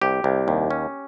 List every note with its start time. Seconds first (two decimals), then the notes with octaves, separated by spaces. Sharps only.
0.02 C2 G4
0.24 C2
0.48 D#2
0.70 C#4